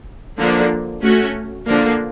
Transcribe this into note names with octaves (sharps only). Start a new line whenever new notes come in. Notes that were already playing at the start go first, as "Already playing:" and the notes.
D3 F3 A#3 D4
A3 C#4 F#4
D3 F3 A#3 D4